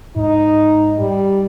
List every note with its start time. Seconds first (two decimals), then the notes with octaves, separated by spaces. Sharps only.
0.16 G#2 D#4
0.98 G3